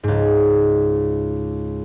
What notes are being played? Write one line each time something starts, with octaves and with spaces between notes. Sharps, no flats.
C#2 G#2